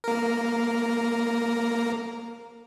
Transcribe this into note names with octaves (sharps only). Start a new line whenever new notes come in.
A#3 A#4